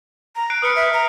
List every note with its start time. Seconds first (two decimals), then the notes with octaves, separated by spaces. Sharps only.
0.36 A#5
0.50 F#6 C7 D7
0.62 B4 D#6 F6 C#7
0.76 E5
0.93 A#5